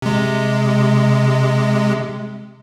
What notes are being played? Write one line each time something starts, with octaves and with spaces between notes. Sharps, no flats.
C3 G#3